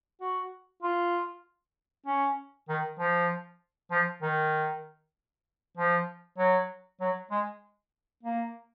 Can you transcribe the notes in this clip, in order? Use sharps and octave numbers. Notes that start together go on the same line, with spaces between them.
F#4
F4
C#4
D#3
F3
F3
D#3
F3
F#3
F#3
G#3
A#3